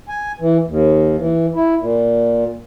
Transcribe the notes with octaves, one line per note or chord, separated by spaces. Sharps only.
G#5
E3
D#2
E3
E4
A#2